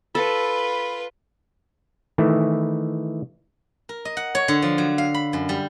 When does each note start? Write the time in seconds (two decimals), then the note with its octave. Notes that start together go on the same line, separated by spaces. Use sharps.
0.15 F4 A4 B4 B5
2.18 D#3 E3 A3
3.89 A#4
4.05 D#5
4.17 F#5
4.35 C#5
4.48 D3
4.62 F3
4.78 F#3
4.98 F5
5.14 B5
5.33 F#2
5.49 G3